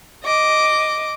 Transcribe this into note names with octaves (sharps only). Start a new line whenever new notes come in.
D#5 D6